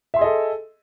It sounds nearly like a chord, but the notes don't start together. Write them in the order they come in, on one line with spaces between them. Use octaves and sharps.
E5 C6 G#4 D#5 A4